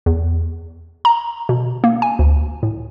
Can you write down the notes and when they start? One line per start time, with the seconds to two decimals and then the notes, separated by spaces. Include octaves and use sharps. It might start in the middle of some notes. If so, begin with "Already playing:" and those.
0.06 E2
1.05 A#5
1.49 B2
1.84 A#3
2.02 G#5
2.19 D2
2.63 A2